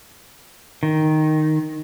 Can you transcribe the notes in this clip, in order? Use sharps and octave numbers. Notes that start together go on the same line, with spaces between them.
D#3